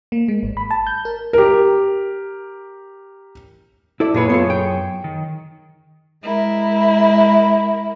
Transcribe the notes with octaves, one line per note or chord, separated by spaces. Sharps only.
A#3
G#3
G#1
B5
A5
G6
A#4
G4 A#4
E4 A4 D5
F#2 A#2 G#4 A4 B4 C#5
B3 F4 A4
G5
D#3
G#3 E4 A#4